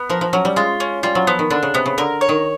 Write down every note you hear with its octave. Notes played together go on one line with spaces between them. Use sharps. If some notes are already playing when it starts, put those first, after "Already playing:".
Already playing: B3
F3 A#4
F3
F#3 C#4
G3
G#3 F4
C#4
G3 F4
F#3
F3 B3
D#3
D3 D4
C#3
C3 B3
C#3
D3 A#4
C#5
D#3